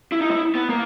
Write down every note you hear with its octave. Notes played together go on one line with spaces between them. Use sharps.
E4
D#4
E4
B3
A#3